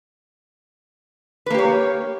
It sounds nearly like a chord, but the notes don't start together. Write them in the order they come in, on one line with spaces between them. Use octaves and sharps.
B4 A#3 G4 C#5